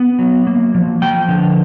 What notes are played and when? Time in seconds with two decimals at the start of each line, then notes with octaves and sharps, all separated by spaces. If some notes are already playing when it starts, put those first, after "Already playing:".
Already playing: B3
0.19 F#3
0.47 A#3
0.75 F3
1.02 F3 G5
1.28 D3